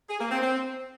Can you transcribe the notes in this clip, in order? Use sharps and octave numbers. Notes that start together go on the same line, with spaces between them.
G#4
A#3
C4
C4